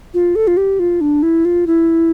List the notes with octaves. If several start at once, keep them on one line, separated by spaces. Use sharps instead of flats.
F4
A4
F4
G4
F4
D4
E4
F4
E4